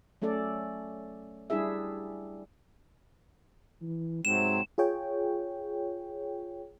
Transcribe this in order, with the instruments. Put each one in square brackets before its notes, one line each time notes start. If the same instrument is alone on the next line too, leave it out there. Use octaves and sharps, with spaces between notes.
[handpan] F#3 A3 C#4 A4 D5
G3 D4 E4 G#4 E5
[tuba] E3
[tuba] G#2 [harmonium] C3 F#3 C4 [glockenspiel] E7
[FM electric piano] F4 G#4 C#5 G5